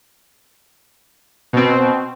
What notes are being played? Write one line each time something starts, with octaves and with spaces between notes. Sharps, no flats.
B2 C4